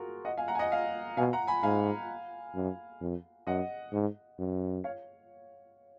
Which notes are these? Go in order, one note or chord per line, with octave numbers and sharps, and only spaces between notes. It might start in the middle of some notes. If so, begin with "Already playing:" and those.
Already playing: F4 F#4 G#4 A#4
D#5 F#5
F5 G#5
F#5 A#5
G#5
D#5 F#5
F5 G#5
B2 F5 G#5
F#5 A#5
G#5 B5
G#2 F5 G#5
F#2
F2
F#2 D#5 F#5
G#2
F#2
C#5 F5